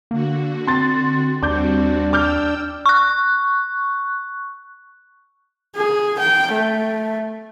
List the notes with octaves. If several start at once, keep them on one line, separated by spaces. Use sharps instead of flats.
D3 A#3 F#4
C4 C6 A6
D#2 G3 C4 D4 F#4 D6 G6
G5 D6 E6 F6 G6
C#6 F#6
G#4
G5
A3